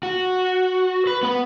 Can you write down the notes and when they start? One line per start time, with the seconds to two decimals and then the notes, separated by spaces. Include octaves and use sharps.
0.03 F#4
1.07 B4
1.23 B3 B4